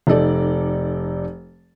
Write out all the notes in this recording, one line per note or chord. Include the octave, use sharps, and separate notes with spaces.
F1 D#4 A4 D5